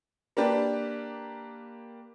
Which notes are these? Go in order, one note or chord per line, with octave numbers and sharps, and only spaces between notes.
A#3 D4 G4 B4